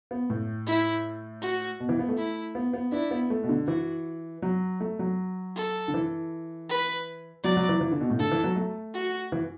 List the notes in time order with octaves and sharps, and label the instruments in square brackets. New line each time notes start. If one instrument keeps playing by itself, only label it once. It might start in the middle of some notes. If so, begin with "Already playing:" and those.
[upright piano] B3
A2
[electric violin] E4
F#4
[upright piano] B2
E3
B3
A3
[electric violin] E4
[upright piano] B3
B3
[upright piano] D4 [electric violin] E4
[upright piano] B3
A3
B2
D3
[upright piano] E3 [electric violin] F#4
[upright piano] F#3
A3
F#3
[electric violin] A4
[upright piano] D3
E3
[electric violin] B4
[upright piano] F#3 [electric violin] D5
[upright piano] F#3
E3
E3
D3
B2
A2
[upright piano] D3 [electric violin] A4
[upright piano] E3
F#3
A3
[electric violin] F#4
[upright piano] E3